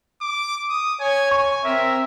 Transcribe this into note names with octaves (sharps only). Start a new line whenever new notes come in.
D6
D#6
C#5 G#5
G#5 C#6
C4 A#4 E5